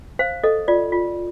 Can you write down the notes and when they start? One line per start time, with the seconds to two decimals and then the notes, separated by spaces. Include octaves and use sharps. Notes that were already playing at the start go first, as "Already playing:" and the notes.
0.19 C5 F5
0.44 A4 D#5
0.68 F4 D5
0.92 F4